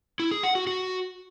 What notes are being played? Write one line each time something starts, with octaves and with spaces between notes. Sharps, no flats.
E4
G#4
F#5
F#4
F#4